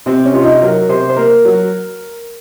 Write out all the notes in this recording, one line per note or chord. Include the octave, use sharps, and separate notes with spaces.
C3 C4
C#4
C3 F4
D#4
F#3 A#4
C3 C5
C5
A#3 A#4
F#3